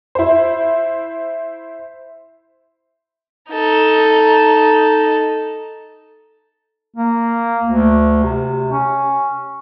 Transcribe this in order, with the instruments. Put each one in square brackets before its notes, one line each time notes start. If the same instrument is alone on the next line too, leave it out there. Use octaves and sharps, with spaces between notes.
[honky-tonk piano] E4 C5
[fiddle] D#4 A4
[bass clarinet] A#3
D2
C3
C#4